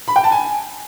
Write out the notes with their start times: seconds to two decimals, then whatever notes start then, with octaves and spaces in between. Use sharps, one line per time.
0.08 B5
0.16 G5
0.24 A5
0.32 G#5